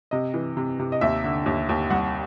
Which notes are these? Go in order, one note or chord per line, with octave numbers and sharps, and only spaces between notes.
C3 D#5
E3
C3
C3
D#5
D#2 E5
D3
D#2
D#2
C2 F#5